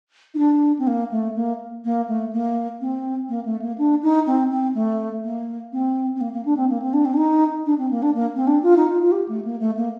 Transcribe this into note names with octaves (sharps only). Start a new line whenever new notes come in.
D#4
D4
C4
A#3
A3
A#3
A#3
A3
A#3
C4
A#3
A3
A#3
D4
D#4
C4
C4
A3
A#3
C4
C4
A#3
A#3
D4
C4
A#3
C4
D4
C4
D4
D#4
D4
C4
A#3
D4
A#3
C4
D4
F4
D#4
F4
F4
G4
A3
A#3
A3
A#3